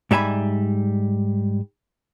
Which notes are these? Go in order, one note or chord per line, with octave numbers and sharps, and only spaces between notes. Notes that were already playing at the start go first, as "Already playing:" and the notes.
G#2 G3 E5 G#5 B5